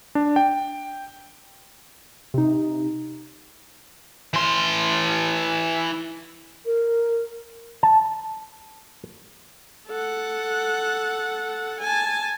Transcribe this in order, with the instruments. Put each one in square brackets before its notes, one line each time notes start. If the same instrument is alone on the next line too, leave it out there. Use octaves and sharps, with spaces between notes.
[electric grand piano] D4
G5
[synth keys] C3 D#4
[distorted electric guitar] E3 C6
[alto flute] A#4
[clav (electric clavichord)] A5
[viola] A4 F#5
G#5 A5